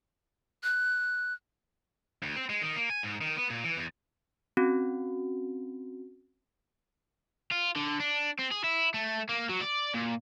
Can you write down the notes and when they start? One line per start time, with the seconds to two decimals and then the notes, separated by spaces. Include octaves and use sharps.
0.63 F#6
2.23 D2
2.36 C4
2.50 G#3
2.62 D#3
2.76 A#3
2.90 G#5
3.03 G#2
3.21 D#3
3.36 B3
3.50 A#2
3.64 E3
3.77 E2
4.57 C4 C#4 F#4
7.51 F4
7.76 D3
8.00 D4
8.39 C4
8.51 G#4
8.64 E4
8.94 A3
9.29 A#3
9.49 F#3
9.61 D5
9.94 A#2